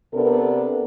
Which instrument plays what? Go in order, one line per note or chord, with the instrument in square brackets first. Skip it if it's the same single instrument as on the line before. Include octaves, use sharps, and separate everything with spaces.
[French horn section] C3 B3 D4 A4 A#4